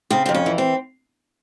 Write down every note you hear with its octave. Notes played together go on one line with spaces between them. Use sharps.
C#3 C4
F2 C4
C#4
E3
C4